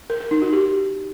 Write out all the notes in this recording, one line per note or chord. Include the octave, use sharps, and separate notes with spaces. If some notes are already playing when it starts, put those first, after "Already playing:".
A#4
A#4
D#4
F#4
G4